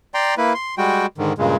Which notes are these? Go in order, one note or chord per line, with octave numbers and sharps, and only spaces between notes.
D5 G5 A#5 C6
A#3 E4 B4
C6
G3 G#3 F#4 G5
G#2 D3 D#3
G2 A#2 C#3 G#3